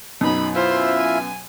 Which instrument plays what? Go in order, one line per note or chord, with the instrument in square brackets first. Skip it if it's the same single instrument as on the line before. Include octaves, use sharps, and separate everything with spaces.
[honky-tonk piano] F#2 B2 [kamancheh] D#4 B5
[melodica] E4 F4 E5 [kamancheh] C5
[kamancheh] G#5